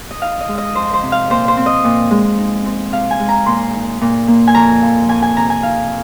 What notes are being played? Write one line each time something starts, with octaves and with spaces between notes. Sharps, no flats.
D#5
D#4 F5
D#5
G#3
D#5
F2 C5
C5
C3
F5
A#2 C5
C5
C4
D#5
A#2
G#3
D#4
C4
C3 F5
G#5
G#3
A#5
A#2 C6
D#4
A#2
A#3
G#5
F2 A#5
F3
F2 G#5
G#5
C3 A#5
G#5
D#4 F5